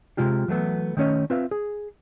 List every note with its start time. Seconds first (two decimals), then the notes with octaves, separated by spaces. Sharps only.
0.17 C3 G#3 F4 G4
0.48 E3 F#3 A3 B3
0.97 D#3 A3 C#4 C#5 D#5
1.30 C4 F4 B4 E5 F5
1.51 G#4